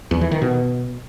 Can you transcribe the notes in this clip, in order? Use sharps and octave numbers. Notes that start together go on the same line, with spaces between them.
E2
E3
D#3
B2